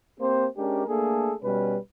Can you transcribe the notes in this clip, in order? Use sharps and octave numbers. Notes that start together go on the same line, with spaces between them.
A#3 C4 G4 C5
G#3 C#4 D4 G4 A#4
A3 A#3 D4 G#4 A4
B2 G3 C#4 B4